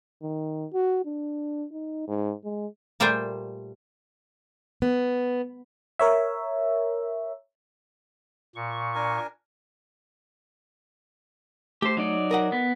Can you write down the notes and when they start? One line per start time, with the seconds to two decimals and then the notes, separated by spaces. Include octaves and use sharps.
0.23 D#3
0.73 F#4
1.05 D4
1.72 D#4
2.08 G#2
2.44 G#3
3.00 A#2 G3 A3 C5 G5 G#5
4.82 B3
5.99 A#4 C#5 E5
8.56 A#2 C#6
8.95 D4 A#4 G#5
11.82 A3 G4 C5
11.97 F#3 D#4 D5
12.31 A#4 D#5 F#5
12.52 B3